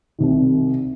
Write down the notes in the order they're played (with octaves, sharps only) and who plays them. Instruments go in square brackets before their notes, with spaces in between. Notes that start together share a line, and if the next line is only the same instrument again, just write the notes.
[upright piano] C2 C3 D#3